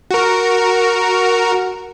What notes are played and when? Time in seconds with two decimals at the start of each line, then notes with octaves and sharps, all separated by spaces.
0.11 F#4 A#4